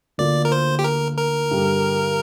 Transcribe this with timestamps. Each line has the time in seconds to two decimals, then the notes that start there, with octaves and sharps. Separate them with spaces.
0.18 D2 D3 A#3 F4 D5
0.45 A#4
0.52 C5
0.79 G4
0.84 A#4
1.18 A#4
1.51 G2 D3 G3